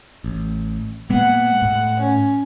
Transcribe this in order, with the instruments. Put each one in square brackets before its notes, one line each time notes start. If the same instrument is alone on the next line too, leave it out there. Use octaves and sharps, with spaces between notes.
[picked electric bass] A1
[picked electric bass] A#2 G#3 B3 [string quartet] F#5
[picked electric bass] A2
[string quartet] C#4